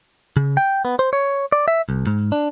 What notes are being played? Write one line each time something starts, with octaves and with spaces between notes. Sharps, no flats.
C#3
G5
B3
C5
C#5
D5
E5
C2
G#2
D4